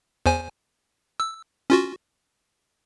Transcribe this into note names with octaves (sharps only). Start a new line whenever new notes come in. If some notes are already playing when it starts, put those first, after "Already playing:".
E2 C5 G#5
E6
C#4 F4 F#4